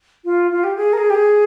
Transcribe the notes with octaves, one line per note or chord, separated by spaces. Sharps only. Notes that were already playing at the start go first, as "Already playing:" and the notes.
F4
F4
G4
G#4
A#4
G#4
G4
G#4